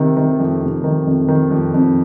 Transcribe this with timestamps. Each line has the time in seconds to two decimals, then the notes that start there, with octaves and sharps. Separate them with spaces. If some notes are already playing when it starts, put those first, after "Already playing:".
Already playing: C3 D#3
0.17 D#3
0.39 F2
0.61 C3
0.84 D#3
1.07 F2
1.28 D#3
1.51 F2
1.74 F2